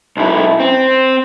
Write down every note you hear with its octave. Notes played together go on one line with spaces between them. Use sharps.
B1 E4
C4